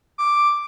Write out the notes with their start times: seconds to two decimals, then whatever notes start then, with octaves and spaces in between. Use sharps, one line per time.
0.18 D6